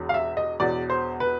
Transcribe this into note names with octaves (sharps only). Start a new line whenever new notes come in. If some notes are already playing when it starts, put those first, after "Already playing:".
Already playing: E1 E2 B2
F5
E5
D#5
E1 E2 B2 D5
C5
B4